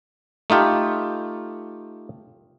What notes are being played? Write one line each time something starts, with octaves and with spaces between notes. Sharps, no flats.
A3 D#4 F4 G4